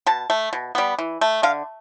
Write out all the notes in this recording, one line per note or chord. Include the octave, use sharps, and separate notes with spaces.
B2 A5
A3
B2
G3 B3
E3
A3
D3 F5